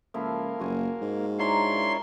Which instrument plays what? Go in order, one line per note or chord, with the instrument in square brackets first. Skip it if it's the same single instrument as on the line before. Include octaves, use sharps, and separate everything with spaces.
[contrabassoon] C#2 [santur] F3 E4 A4 [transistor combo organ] A#3
[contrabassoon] F#1 [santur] F4 F#4 G#5
[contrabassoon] G#2
[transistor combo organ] D4 E4 C#5 [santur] G#4 G#5 A#5 [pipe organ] C6
[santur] F#3 A#3